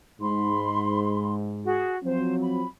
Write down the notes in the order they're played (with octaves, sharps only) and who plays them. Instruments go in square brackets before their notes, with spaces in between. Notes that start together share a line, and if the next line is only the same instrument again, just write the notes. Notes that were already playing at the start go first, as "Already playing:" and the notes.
[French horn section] G#2 [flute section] B5 C6
[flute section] F#4 G#4
[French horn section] F3 F#3 C4 [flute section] C5
[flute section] B5